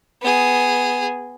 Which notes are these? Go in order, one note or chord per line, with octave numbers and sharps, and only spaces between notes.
B3 G#4